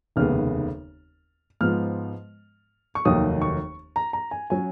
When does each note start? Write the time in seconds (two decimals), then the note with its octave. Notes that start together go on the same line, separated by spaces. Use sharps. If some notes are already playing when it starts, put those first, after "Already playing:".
0.16 F1 D#2 C#3 G#3 B3 F6
1.61 G#2 F3 B3 F6
2.95 C#6
3.05 F1 D#2 D#3 F#3 D#6
3.42 C#6
3.96 A#5
4.13 A#5
4.31 G#5
4.50 F#3 C#4 G#5